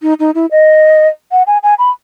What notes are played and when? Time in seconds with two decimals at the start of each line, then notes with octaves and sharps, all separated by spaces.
0.02 D#4
0.20 D#4
0.35 E4
0.51 D#5
1.32 F#5
1.47 G#5
1.63 G#5
1.79 B5